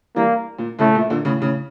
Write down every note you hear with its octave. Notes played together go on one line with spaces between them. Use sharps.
E3 G3 A#3
A#2
A2 C#3 A3
A#2
A#2 D3
A2 C#3
A2 C#3